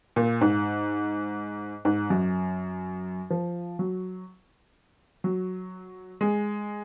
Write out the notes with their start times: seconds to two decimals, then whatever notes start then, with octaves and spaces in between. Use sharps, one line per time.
0.16 A#2
0.41 G#2
1.85 G#2
2.10 F#2
3.30 F3
3.79 F#3
5.24 F#3
6.21 G#3